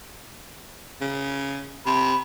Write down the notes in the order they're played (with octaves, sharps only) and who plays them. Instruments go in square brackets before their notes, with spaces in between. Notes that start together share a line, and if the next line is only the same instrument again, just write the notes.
[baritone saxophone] C#3
[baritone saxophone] C3 [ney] B5